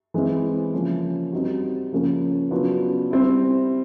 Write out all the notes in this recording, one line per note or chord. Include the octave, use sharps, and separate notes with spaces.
E3 G#3 C4 E4
C#3 F3 A#3 C#4
G3 C4 D#4 F#4
C#3 F3 A#3 C#4
C#3 F#3 B3 D4 F4
G3 C4 E4